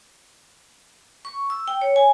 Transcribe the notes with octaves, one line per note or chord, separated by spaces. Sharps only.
C#6
E6
G5
C#5
G#5